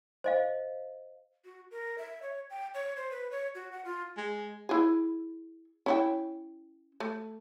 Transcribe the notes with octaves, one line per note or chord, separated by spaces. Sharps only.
C5 D#5 F5
F#4
A#4
E5
C#5
G5
C#5
C5
B4
C#5
F#4
F#5
F4
G#3
E4 G#4
C#4 E4 G5
A3